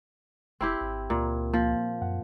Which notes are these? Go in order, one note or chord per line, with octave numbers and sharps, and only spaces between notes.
F1 C4 E4 G4
G#1
C#2 A#2
F3 A#3
F#2 F#5